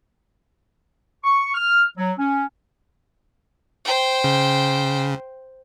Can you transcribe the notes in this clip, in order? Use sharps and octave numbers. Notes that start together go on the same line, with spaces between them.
C#6
F6
F#3
C#4
C5 G5
C#3